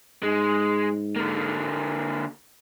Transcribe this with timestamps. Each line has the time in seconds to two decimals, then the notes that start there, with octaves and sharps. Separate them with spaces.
0.23 G#2 G#3
1.16 D3 A#3